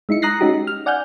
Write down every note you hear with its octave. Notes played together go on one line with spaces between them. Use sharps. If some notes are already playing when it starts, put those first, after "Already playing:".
G#3 D#4 E4 C#7
A#5 D#6 F#6 A#6 C7
G#3 C#4 D#4 F#4 G4
F6
D5 F#5 G#5 F6 G6